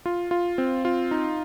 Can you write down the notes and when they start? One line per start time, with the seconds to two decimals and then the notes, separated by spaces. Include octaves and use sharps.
0.06 F4
0.31 F4
0.58 C4
0.85 F4
1.11 D#4